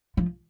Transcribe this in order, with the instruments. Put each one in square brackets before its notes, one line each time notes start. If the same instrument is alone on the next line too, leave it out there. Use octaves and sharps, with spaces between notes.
[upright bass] F3